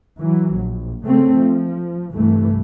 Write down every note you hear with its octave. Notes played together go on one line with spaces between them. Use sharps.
E3 F#3
A#1
C#3 A3 C4
F3
C2 G2 E3 A3